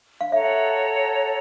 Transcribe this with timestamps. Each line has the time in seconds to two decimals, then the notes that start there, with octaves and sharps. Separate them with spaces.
0.21 F5
0.31 A4 C#5 E5 F#5 A#5